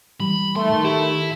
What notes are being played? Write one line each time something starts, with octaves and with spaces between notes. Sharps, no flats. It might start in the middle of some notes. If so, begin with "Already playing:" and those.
E3 G3 B5
D#3 A3 C6
E4 G4